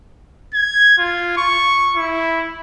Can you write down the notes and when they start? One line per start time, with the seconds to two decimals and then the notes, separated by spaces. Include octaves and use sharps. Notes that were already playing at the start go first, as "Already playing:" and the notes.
0.54 G#6
0.98 F4
1.37 C#6
1.96 E4